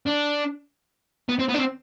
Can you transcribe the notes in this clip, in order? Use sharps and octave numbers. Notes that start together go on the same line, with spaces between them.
D4
B3
C4
B3
D4
C4